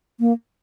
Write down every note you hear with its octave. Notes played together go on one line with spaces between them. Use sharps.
A#3